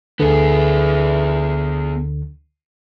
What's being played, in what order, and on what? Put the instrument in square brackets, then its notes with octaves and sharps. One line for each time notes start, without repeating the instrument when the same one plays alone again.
[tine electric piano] D2 D3 [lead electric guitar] B3 G#4